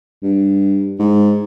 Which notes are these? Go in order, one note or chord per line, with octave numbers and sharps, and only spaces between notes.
G2
G#2